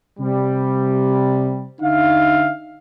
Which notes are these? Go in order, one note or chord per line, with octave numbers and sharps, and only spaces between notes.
C3 G3
D3 D#4 E5 F5